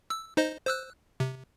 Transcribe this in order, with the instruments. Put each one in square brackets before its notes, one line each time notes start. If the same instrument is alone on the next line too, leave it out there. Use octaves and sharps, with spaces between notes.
[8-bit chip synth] E6
D#4 C5 D#5
C5 E6 F#6
C3